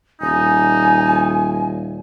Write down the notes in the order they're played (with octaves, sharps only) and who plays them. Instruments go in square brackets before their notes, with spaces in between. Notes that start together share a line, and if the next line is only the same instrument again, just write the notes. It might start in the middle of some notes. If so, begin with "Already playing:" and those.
[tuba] D#1 [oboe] D#4 [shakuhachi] G#5